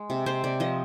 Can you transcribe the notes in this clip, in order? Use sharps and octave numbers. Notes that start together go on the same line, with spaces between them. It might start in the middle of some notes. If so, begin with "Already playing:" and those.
Already playing: G#3
C3
C3 C5
C3 D5
F3 D#5